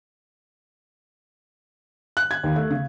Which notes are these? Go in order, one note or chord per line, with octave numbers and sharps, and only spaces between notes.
F#6
G#6
D#2
A3
C#3